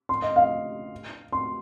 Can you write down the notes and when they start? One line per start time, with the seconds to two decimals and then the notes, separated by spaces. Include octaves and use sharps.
0.09 C6
0.22 D#5
0.36 F5
1.32 C6